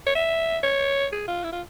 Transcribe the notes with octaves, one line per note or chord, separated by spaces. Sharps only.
C#5
E5
C#5
G#4
F4
E4
F4